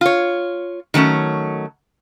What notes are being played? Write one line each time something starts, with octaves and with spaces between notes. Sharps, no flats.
F4 C#5
D#3 F#3 A3 C#4